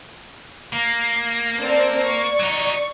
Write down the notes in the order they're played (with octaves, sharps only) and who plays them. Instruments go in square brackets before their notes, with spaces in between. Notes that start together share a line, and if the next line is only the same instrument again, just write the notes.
[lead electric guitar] A#3
[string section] C4 A4 D5
D5 C#6
[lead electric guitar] F#3 D#4